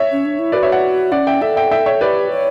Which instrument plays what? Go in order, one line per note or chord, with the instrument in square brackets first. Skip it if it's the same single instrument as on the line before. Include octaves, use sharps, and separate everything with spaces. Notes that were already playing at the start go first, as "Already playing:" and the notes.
Already playing: [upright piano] C#5 E5
[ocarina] C#4
D4
E4
[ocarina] F#4 [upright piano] B4 D5
[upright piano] C#5 E5
D5 F#5
[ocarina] C#4 [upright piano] D5 F#5
[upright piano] E5 G5
[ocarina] A4 [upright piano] E5 G5
[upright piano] E5 G5
E5 G5
C#5 E5
[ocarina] G4 [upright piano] B4 D5
[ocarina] C#5